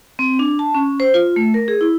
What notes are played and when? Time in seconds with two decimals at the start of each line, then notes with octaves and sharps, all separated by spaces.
0.19 C4
0.39 D4
0.59 A5
0.75 C#4
1.00 C5
1.14 F4
1.36 A3
1.54 A#4
1.68 G#4
1.81 E4